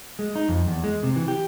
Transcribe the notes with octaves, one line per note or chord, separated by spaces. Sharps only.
G#3
D#4
F2
E2
G#3
C3
E3
G4